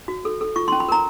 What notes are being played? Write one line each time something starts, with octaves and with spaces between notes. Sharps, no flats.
F#4
A4
A4
F4 C#6
C6
C#4
B5
A#4 A#5